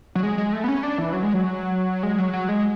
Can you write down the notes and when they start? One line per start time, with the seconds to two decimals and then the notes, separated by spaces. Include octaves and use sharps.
0.15 F#3
0.23 G#3
0.38 G#3
0.53 A3
0.64 B3
0.68 C#4
0.83 D4
0.98 E3
1.13 F#3
1.23 G#3
1.34 F#3
2.03 G#3
2.18 F#3
2.33 F#3
2.48 G#3